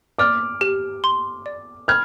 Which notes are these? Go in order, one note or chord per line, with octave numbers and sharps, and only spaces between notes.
D5 D6 F6
G4
C6
D5
B5 F6 G#6